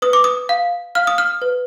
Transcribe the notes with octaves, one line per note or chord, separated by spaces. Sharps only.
B4 D#6
D6
D#6
F5
F5 F6
D#6
F6
B4